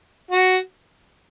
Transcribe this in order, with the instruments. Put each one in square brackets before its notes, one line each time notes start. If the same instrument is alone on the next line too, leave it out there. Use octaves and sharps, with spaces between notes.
[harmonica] F#4